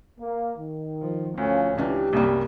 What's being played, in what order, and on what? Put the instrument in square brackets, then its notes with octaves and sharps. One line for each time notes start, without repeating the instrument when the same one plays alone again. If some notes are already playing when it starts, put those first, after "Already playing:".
[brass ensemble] A#3
D#3
[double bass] F3
[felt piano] D2 [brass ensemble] A2 F3 F4 [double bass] C#4
[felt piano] C#2 C#4 D4 [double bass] E3 [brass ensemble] G4
[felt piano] C2 F#2 G3 [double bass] A#3